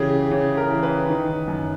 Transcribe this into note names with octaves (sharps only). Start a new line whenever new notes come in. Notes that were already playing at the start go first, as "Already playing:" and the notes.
Already playing: C#3 E3 G4 G#4
C#3
A#4
E3
B4
D#3
F#2